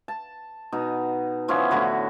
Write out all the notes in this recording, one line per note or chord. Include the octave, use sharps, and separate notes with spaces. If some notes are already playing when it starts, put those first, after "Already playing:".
A5
B2 D#4
E3 F3 B3 C#4
A2 D3 F#4 B4